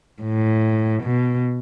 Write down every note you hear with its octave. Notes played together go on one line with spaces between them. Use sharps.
A2
B2